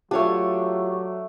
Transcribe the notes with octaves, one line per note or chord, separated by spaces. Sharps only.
F#3 A3 D4 F4 G4 C#5